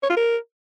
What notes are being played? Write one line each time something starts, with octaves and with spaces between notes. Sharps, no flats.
C#5
F4
A#4